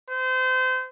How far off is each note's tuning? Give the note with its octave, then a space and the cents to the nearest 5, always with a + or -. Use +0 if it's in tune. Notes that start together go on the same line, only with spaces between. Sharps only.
C5 -30